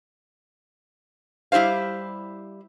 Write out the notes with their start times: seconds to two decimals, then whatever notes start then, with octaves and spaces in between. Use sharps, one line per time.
1.52 G3 E4 G4 C5 F5